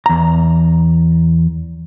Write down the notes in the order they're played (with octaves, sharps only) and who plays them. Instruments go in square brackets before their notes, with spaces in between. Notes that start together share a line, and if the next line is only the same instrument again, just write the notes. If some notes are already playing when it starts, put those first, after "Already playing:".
[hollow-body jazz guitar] E2 A#5